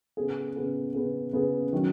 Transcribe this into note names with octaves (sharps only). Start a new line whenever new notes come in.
C#3 B3 G#4
C#3 B3 G#4
C#3 B3 G#4
C#3 B3 G#4
D#3 F#3 C#4